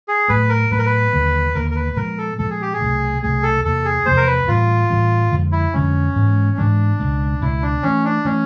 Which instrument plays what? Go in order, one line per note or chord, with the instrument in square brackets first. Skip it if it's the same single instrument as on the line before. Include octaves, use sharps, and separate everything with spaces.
[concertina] G#4
[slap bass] A2 F#3 B3 [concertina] B4
[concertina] A#4
[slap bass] A2 F#3 B3 [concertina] B4
[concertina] A#4
B4
[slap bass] D#2 D3 F#3 A#3
[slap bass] D#2 D3 F#3 A#3 [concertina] A#4
[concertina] A#4
B4
[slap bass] A#2 F3 G#3 B3 [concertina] A#4
[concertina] A4
[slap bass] A#2 F3 G#3 B3 [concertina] A4
[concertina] G#4
G4
G#4
[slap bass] C2 B2 F#3 A3
[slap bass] C2 B2 F#3 A3 [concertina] G#4
[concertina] A4
[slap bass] E2 C3 F3 A#3 [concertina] A4
[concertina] G#4
[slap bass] E2 C3 F3 A#3 [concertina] C5
[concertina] A#4
B4
[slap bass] A2 E3 G3 C4 [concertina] F4
[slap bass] A2 E3 G3 C4
F2 D3 F3 G#3
[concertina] E4
[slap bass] F2 D3 F3 G#3 [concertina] C#4
[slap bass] G#2 E3 G#3 B3
[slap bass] G#2 E3 G#3 B3 [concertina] D4
[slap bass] C#2 B2 G#3
[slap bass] C#2 B2 G#3 [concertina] E4
[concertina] D4
[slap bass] G2 E3 A3 [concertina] C#4
[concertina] D4
[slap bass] E3 A3 [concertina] C#4